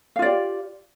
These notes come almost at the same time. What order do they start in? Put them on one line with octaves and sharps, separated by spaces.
F5 F4 D5 G4